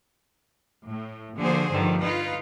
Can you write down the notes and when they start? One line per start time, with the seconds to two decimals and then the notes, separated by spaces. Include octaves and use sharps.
0.86 A2
1.37 D3 F3 A#3 F#4 G#4 C5
1.71 G2 D3 D#3 F3
2.01 D#4 F4 B4 F5